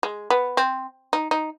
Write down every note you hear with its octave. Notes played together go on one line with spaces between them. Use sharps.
G#3
B3
C4
D#4
D#4